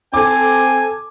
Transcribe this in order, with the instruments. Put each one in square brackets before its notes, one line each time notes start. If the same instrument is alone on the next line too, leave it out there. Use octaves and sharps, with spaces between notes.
[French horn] C4 [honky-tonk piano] A4 D6 [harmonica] G#5